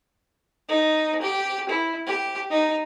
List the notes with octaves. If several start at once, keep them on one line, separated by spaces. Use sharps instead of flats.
D#4
G4
E4
G4
D#4